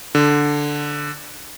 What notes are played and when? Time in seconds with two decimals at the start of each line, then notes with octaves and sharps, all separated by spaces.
0.15 D3